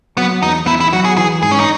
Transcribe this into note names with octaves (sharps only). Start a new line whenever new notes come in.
F#3 B3
E2 D#4
E2 E4
E4
F#3 F#4
G#4
E3 G#4
G#2 G#4
C#4
D#4